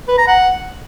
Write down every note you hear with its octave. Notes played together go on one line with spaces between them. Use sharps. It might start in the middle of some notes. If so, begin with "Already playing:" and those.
B4
A#5
F#5